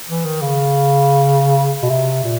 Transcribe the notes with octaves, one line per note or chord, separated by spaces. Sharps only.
E3
D#3
C#3
B2
C3
A#2